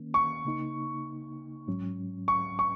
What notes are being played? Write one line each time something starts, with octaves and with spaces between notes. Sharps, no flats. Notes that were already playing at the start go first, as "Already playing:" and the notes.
Already playing: D#3 A#3 C#4
C#6
C#3 A#3 D#4
G#2 F#3 C#4
C#6
C#6